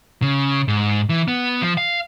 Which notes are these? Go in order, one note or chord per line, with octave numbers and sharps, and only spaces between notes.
C#3
G#2
E3
B3
F3
F5